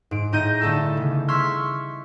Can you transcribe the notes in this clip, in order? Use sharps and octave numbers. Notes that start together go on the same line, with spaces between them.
G#2 D7
A2 D#4 D#5 G6 A#6 D#7
G1 G3 A3 A4 A5 E6
C#3
C6 C#6 E6 F6 G#6 B6